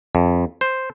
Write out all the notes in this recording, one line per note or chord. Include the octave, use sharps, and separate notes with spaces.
F2
C5